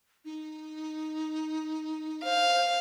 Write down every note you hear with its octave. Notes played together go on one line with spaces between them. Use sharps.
D#4
C5 F5